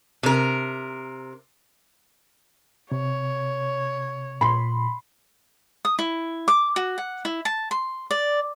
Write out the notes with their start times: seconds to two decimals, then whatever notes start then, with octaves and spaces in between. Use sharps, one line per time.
0.23 C3 A#4
2.92 C3 C#5
4.41 A#2 B5 C6
5.85 D#6
5.99 E4
6.48 D6
6.76 F#4
6.98 F#5
7.25 E4
7.45 A5
7.71 C6
8.11 D5